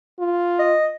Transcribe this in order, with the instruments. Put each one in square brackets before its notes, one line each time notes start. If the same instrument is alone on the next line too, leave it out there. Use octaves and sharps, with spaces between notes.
[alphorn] F4
[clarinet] D#5